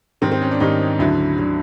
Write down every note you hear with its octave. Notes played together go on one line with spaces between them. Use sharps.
G#2 D#3 G3 C4
C4
C#4
D4
G#2 D#3 G3 D#4
D2 D3 F#3 E4
D3 F#3